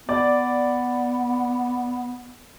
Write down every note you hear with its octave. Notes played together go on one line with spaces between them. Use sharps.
B3 D5